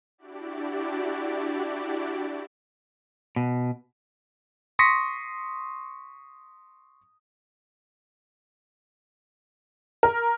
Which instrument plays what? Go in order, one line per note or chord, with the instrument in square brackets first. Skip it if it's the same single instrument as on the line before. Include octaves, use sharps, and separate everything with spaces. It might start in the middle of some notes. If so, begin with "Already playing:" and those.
[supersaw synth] D4 E4 F#4 G4 D5
[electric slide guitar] B2
[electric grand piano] C6 C#6 D#6 A#6 B6 C#7
[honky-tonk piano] A#4